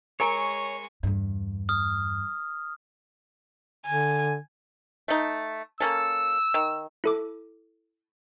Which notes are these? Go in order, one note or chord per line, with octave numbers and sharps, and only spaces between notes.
G#3 A#4 C#5 G#5 A#5 C#6
E2 G2
D#6 F6
D3 G#5
A3 D#4
A#3 C#4 A4 E6
D#3
E4 A4 D6